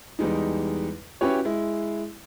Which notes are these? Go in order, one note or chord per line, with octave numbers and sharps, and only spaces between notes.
E2 G3 G#3 D#4
C#4 E4 F#4 G4 B4 C#5
G#3 E4